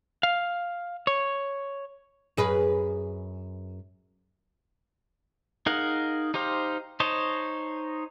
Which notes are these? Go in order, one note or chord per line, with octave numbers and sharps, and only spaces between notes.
F5
C#5
F#2 G#4 B4
D#4 G#4 A#4 F5 F#5
D#4 G4 C5 F5
D#4 C5 C#5 D#5 A5